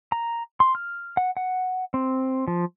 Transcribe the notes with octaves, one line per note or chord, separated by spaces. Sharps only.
A#5
C6
F6
F#5
F#5
C4
F3